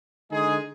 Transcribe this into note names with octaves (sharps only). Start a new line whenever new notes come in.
D3 G#3 D#4 G#4